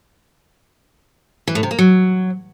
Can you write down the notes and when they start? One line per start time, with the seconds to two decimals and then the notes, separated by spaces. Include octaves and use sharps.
1.48 E3
1.55 A2
1.63 C3
1.71 A#3
1.79 F#3